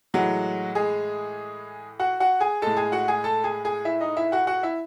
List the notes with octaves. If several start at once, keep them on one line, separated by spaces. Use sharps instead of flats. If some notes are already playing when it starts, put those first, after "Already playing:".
A2 E3 F#3 G#3 F#4
G#3 G#4
F#4 F#5
F#4 F#5
G#4 G#5
A2 G#3 A4 A5
G#4 G#5
F#4 F#5
G#4 G#5
A4 A5
G#4 G#5
G#4 G#5
E4 E5
D#4 D#5
E4 E5
F#4 F#5
F#4 F#5
E4 E5